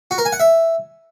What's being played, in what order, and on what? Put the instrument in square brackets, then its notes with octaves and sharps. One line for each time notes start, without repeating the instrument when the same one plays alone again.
[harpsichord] F#4
A#4
G#5
F#5
E5